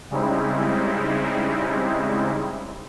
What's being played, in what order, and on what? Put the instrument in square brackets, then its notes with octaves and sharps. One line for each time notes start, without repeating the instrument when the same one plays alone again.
[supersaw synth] C#3 G3 G#3 C4 D#4 E4